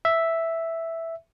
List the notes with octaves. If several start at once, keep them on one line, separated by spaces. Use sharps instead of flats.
E5